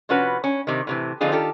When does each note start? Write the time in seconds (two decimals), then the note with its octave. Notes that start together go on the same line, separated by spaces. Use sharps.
0.09 C3 F3 C#4 F#4 B4
0.44 C#4
0.67 C3 D#3
0.87 A2 C3 E3
1.21 D3 F3 C4 D#4 F4 G#4
1.32 D#3 F4 G4 A4